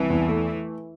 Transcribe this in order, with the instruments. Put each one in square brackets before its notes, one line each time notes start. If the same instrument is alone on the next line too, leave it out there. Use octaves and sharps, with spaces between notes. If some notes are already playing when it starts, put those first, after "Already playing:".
Already playing: [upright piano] C2 [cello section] E3
[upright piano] E2
A3